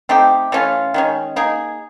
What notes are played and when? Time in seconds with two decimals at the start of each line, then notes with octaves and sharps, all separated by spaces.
0.09 A3 C4 D#4 G4
0.52 E3 A3 C#4 F4
0.94 D#3 G#3 C#4
1.36 A#3 D#4 G#4